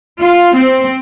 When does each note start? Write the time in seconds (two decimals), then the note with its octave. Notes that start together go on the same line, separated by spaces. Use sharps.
0.21 F4
0.56 C4